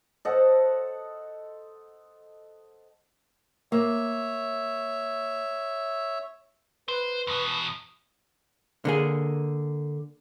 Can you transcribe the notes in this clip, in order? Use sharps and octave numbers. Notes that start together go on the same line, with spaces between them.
A4 C5 D#5 F#5
A#3 C#5 E5
B4 C5
E2 B2
D3 A#3 G#4